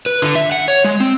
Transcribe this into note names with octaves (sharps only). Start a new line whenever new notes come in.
B4
D3
E5
F#5
C#5
G#3
C4